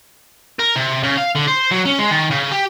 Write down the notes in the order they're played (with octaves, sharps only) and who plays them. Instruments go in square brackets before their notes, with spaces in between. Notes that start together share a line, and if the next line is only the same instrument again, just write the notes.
[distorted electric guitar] A#4
C3
C#3
F5
D3
C5
F#3
C#4
G#3
D#3
C#3
G4